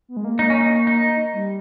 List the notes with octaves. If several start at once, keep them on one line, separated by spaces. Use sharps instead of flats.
B3
G#3
A#3
D#4
C#4
D#4
D#4
G3